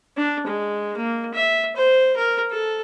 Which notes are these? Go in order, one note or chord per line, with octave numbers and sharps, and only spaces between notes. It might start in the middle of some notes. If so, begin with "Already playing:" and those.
D4
G#3
A#3
E5
C5
A#4
A4